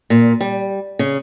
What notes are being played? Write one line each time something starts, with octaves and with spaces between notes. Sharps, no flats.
A#2
G3
C#3